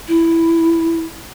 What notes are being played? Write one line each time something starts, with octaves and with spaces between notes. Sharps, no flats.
E4